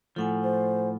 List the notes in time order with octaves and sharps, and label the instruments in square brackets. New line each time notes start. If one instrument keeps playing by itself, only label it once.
[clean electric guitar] A2 F3 [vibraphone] A4 F#5 G#5
[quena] C5